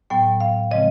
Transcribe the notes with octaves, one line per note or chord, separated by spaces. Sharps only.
A2 F#3 B3 G5
F5
C#3 F3 G#3 C4 D#5